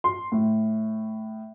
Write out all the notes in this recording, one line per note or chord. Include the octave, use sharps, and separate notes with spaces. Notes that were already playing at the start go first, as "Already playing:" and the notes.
C6
A2